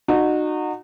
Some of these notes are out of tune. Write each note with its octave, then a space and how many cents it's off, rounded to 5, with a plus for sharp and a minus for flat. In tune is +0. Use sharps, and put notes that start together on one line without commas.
D#4 -30 F#4 -15